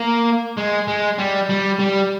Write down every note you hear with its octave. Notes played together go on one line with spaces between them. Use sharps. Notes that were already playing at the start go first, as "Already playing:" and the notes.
Already playing: A#3
G#3
G#3
G3
G3
G3